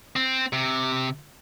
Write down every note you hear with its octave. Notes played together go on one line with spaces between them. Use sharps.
C4
C3